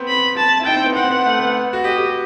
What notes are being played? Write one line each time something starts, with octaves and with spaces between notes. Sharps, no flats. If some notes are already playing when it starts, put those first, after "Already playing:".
Already playing: B3 C4
B5
A5
E4
D#4 G5
C4
B3
C4 F#5
B3
A3
B3
F#4
G4 D#5
G4